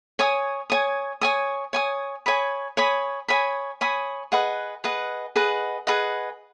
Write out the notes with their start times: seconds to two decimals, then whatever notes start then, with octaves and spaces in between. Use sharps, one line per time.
0.19 C#5 G#5 D#6
0.70 C#5 G#5 D#6
1.21 C#5 G#5 D#6
1.73 C#5 G#5 D#6
2.26 C#5 G#5 B5 D#6
2.77 C#5 G#5 B5 D#6
3.28 C#5 G#5 B5 D#6
3.81 C#5 G#5 B5 D#6
4.32 G#4 B4 D#5 F#5
4.84 G#4 B4 D#5 F#5
5.36 G#4 B4 D#5 F#5
5.87 G#4 B4 D#5 F#5